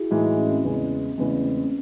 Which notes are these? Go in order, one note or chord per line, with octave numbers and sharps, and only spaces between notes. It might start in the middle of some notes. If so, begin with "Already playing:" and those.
Already playing: E4 F#4 G#4
A2 E3 G#3 D#4 F#4
C#4
C4
E2 C#3 G#3
E2 C#3 G#3 A3
C4
C4
C#4